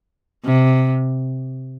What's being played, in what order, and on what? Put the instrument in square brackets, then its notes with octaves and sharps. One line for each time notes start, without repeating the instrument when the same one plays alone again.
[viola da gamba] C3